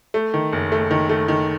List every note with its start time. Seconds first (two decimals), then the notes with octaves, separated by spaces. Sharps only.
0.14 A3
0.34 D#3
0.53 F#1
0.72 A3
0.91 D#3
1.09 A3
1.28 D#3